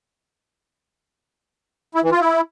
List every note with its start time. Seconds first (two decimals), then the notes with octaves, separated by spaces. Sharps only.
1.95 E4
2.03 E3
2.12 F4
2.20 E4